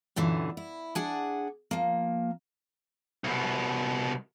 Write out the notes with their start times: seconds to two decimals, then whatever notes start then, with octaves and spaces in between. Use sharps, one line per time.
0.16 F#2 A#2 D3 E3
0.57 E4
0.95 D4 G#4 F#5
1.71 F3 A#3
3.24 C2 B2